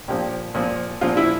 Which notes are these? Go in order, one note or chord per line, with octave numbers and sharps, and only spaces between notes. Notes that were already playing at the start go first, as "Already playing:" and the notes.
A#2 F3 G4
A#2 F3
A#2 F3 F4
E4